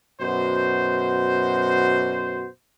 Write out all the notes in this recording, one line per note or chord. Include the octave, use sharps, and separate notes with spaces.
F#2 B2 F#4 C5